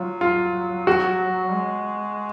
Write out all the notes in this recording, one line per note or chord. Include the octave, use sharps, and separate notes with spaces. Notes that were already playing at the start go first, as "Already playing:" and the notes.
Already playing: F#3 F4
F4
F#4
G#3